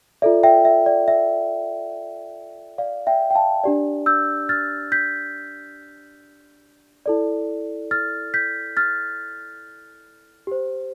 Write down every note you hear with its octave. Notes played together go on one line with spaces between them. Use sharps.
F4 A4 D5 E5
E5 G5
E5
D5
E5
D5 F5
E5 G5
G5
F5 A5
D4 G4 D5
E6 G6
F6 A6
G6 B6
E4 A4 D5
F6 A6
G6 B6
F6 A6
G4 C5